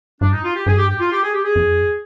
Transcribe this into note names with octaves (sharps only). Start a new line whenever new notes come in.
G2 D4
D#4
F4
G4
G2 G#4
G4
G4
F4
G4
G#4
G4
G#4
F2